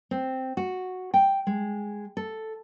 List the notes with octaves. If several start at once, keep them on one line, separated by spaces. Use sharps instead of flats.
C4
F#4
G5
G#3
A4